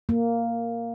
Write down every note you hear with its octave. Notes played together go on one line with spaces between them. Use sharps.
A#3